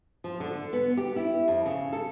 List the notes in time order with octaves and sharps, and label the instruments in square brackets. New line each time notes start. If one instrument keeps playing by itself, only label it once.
[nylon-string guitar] F3
D3
B3
G4
E4
F2
C#3
A4